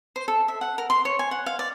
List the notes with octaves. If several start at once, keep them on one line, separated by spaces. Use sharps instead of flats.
C5
A4
E5
F#5
A#4
C6
C#5
G#5
F#5
F5
D5